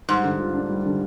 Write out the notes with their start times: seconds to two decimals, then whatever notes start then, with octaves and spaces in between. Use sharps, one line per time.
0.09 G#2 G3
0.24 D3
0.39 F4
0.54 D4
0.69 G3
0.85 D3